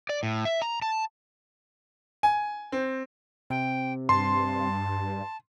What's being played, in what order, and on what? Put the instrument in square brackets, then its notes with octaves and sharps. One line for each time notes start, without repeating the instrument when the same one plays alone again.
[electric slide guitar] D5
A2
E5
A#5
A5
[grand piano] G#5
C4
[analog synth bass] C3 [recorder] G5
[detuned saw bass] G2 [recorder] A5 [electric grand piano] C6